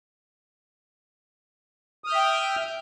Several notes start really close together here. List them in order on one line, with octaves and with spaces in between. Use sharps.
D#6 F6 G6 E5 G5